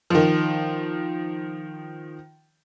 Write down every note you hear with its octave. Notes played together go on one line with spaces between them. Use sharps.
D#3 F3